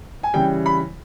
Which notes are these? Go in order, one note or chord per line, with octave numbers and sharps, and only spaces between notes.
G#5
C#3 E3 G3 G5
B5